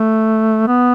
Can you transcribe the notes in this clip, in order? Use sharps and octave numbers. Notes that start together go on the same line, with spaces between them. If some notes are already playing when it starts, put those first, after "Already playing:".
Already playing: A3
B3